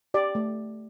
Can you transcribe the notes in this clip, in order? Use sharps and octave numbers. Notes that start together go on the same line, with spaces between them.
G4 D5
A3